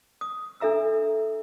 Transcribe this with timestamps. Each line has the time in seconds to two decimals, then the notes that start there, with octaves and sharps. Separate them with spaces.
0.21 D#6
0.60 D4 A4 E5 A#5 E6